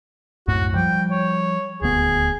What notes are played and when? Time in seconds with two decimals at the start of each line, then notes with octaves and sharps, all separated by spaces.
0.48 C2 F#2 A2 F#4
0.75 F3 G3 G5
1.11 C#5
1.82 D#1 D2 B3 G#4